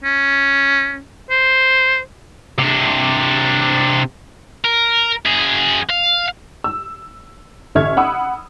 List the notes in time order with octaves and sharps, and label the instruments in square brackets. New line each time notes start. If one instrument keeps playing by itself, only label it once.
[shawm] C#4
C5
[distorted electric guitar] C3 D4
A#4
F#2 G#4
F5
[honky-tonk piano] E6
A1 D3 E5 C#6 F6 G#6
F#5 B5 D#6 E6